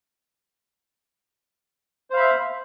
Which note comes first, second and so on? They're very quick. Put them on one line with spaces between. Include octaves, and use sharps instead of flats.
C5 F5 B5 E5